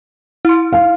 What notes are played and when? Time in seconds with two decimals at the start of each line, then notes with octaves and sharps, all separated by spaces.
0.45 E4 C6
0.73 F5